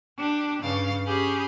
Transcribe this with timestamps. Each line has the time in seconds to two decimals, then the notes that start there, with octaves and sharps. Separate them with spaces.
0.17 D4 G4
0.61 G2 C#3 F5 A6
1.06 C#4 G4 G#4 B5